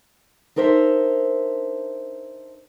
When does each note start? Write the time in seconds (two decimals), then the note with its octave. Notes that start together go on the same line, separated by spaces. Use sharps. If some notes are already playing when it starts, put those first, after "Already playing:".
0.56 D4 D#4 A#4 C5 E5